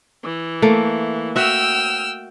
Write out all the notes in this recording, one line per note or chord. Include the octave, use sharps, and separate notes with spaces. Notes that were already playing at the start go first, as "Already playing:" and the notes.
E3
A3 A#3
F#4 E5 G5 E6 F6